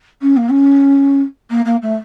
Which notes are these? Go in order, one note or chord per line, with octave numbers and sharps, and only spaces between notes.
C#4
A#3
C#4
A#3
A#3
A3